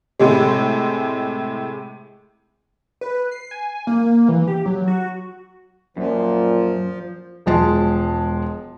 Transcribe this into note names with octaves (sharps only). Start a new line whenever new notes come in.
A2 C3 G#3
B4
C7
G#5
A#3
E3
G4
F#3
F#4
F#2 A#2 F3
E1 F3 G#3 A5